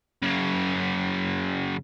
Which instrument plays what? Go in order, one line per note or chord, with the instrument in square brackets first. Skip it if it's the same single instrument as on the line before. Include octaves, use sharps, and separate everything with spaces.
[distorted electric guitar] F#2 C#3